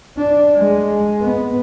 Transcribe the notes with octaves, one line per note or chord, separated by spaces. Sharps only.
D4
G#3
B3